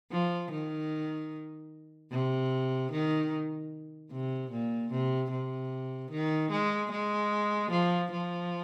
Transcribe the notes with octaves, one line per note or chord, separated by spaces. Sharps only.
F3
D#3
C3
D#3
C3
A#2
C3
C3
D#3
G#3
G#3
F3
F3